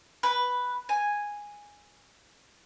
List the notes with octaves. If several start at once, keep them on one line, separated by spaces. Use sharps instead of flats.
B4
G#5